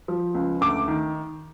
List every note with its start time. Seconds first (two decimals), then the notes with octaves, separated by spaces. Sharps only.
0.08 F3
0.34 C#2
0.61 D2 D6
0.88 D#3